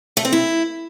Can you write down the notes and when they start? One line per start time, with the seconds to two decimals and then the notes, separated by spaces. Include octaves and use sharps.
0.17 A3
0.25 C4
0.32 E4